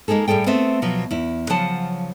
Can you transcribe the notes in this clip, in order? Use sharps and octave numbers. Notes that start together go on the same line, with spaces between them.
G#3 A#3 D#4 G#4 A4
A2 G3 G#4 A4 G5
A3 B3 C4 E5
B2 F3 F#3
E2 E4
C#3 F3 F#3 F#5 A5